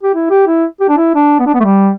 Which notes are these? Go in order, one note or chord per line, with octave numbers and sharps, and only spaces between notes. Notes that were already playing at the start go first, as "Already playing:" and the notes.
G4
E4
G4
E4
G4
D4
E4
D4
B3
D4
B3
A3
G3